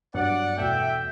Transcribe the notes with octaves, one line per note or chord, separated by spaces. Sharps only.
G2 F#3 B3 D5 F#5
E2 B2 A3 E5 G5